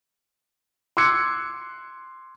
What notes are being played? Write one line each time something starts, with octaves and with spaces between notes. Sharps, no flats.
C6 D6 E6 F#6 G#6 C#7